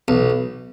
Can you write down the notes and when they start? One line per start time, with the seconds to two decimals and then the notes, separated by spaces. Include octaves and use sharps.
0.08 B1